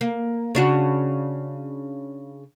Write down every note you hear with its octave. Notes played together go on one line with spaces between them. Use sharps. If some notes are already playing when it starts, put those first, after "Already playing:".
A#3
C#3 D4 F#4